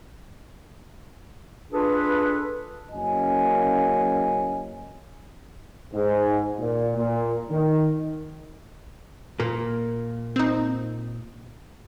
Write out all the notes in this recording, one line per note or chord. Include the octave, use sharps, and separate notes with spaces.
D4 F4 G#4 A4 B4
F#1 F#2 A#3 C#4 D#5 G#5
G#2
A#2
A#2
D#3
A#2 A#3
C4 D#4